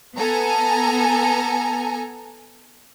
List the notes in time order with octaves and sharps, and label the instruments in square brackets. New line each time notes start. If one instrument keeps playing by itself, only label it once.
[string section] B3 A4 G#5 A#5